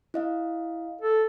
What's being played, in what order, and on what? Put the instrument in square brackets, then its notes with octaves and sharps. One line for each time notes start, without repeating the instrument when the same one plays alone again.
[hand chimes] E4 D#5 F5
[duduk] A4